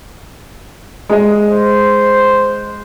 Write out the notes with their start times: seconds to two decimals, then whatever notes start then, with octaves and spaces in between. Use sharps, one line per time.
1.09 G#3 D#5
1.50 C5